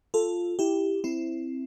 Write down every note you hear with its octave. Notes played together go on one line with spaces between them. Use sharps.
F4 A4
E4 G4
C4 E4